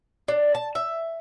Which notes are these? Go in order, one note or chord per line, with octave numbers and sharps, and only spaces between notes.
D4
A5
E5